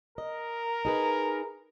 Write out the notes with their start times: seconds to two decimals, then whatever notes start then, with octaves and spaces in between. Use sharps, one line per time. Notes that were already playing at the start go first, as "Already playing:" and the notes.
0.18 A#4 D#5
0.85 D#4 G#4 B4